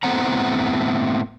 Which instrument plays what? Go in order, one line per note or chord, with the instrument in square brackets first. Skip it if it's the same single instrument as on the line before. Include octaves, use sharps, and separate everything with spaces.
[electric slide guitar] A2 A3 B3 C4 F#5 A#5